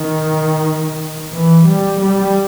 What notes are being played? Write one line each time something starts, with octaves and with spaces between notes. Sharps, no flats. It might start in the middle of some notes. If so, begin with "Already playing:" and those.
Already playing: D#3
E3
G3
G3